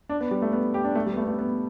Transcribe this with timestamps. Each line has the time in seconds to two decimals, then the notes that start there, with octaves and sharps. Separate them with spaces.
0.09 D4
0.21 B3
0.31 G3
0.42 A3
0.53 B3
0.74 G4
0.84 D4
0.95 A3
1.06 G3
1.13 B3
1.17 A3
1.23 B3
1.28 A3
1.38 B3